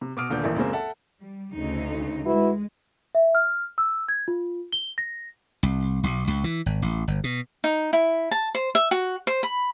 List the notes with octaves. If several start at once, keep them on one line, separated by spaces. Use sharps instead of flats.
C3
B2 F#4 D6 D#6 F6 D7
D#1 A#2 D3 B3 G6
D#1 A1 E3 A#4 E5
C#2 F#2 G#3 A#3 C4
A4 E5 F#5 A5
G3
D2 C#3 D#4
G#3 E4 F#4 B4
E5
F6
E6
G#6
F4
G7
A#6
C2
B1
C#2
E3
G#1
A1
G1
B2
D#4
E4
A5
C5
E5
F#4
C5
B5